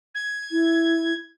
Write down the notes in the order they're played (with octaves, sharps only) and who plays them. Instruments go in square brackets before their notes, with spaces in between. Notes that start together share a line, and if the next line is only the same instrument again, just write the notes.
[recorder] G#6
[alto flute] E4